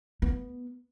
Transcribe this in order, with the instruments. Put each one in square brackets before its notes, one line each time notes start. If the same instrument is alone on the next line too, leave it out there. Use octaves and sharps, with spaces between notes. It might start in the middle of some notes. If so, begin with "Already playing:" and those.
[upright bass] B3